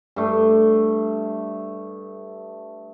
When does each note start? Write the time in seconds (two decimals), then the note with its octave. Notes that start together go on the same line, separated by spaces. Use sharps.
0.16 G2 A3